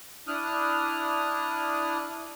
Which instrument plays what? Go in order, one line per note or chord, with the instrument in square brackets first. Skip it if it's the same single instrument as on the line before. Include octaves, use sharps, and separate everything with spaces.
[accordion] D4 E4 D#6 F6 F#6